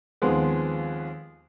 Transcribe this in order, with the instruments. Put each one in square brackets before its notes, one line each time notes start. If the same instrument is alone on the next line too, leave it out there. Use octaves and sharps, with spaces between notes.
[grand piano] D#2 D#3 F3 G#3 B3 C4